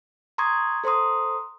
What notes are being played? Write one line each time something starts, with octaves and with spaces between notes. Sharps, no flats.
A#5 C6 C#6 D#6 G#6
A4 C5 A#5 C6 D#6